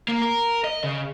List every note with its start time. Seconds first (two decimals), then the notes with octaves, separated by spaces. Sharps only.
0.08 A#3
0.22 A#4
0.64 D#5
0.84 C#3